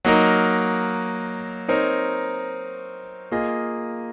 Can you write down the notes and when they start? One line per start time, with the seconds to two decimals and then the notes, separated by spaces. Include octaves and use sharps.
0.05 F#3 A#3 D#4 A#4
1.68 C4 D#4 A#4 C#5
3.31 A#3 F4 G#4 D#5